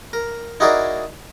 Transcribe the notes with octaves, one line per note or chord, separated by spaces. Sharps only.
A#4
D#4 E4 F#4 G#4 A#4 D5